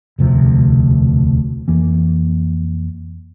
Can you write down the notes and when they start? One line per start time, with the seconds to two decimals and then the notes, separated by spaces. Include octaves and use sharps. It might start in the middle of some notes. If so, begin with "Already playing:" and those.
0.19 E1 D2 C3 F3
1.68 F2 E3 A#3